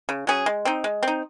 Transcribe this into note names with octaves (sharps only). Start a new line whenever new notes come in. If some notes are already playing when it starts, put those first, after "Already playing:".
C#3
F#3 C#4 G#4
G#3
C4 D#4
G#3
C4 D#4